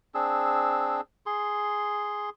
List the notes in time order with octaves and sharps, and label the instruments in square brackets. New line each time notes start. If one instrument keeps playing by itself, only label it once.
[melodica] C4 D4 G#4 E6
G#4 C6